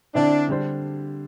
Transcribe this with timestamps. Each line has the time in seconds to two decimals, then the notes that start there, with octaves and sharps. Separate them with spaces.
0.15 D3 C4 D4 E4
0.48 D3 G3 D4 C5